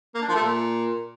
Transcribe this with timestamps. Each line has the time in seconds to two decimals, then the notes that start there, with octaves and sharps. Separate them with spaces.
0.15 A#3
0.22 D4
0.28 F3
0.35 A3
0.42 A#2